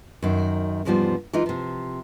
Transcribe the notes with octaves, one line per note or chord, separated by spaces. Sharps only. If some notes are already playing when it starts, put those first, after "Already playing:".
F#2 D#3
E2 G#2 C#3 F3 G3 B3
E3 G#3 D#4 F4
C3 F3